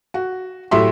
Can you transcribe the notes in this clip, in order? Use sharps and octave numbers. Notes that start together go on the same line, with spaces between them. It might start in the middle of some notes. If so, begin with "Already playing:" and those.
F#4
A2 F#3 G4 E5 C6